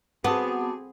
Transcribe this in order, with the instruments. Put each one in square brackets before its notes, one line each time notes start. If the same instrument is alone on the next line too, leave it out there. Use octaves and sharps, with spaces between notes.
[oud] B3 [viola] C4 G#4 [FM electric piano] F#4 A5 D6 [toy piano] F#5 D#6